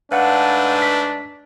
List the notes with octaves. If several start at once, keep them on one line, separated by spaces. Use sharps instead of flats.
G#2 A3 D4 B4 F5 F#5
B6